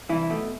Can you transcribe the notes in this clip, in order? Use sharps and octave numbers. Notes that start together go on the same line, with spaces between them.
C2 E3 E4
B2 A3